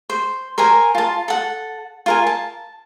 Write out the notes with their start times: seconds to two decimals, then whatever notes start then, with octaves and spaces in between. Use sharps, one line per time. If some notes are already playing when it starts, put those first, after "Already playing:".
0.10 C5
0.58 A#4 C5 G#5 A#5
0.95 F4 A5
1.28 A4 F#5
2.06 F4 A#4 G#5
2.27 A5